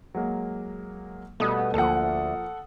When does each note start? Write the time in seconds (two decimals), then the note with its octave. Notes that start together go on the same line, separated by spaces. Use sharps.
0.15 F#3 G#3 A#3
1.40 B2 G3 A3 B3 D#6
1.74 D2 F3 A#3 A4 F#5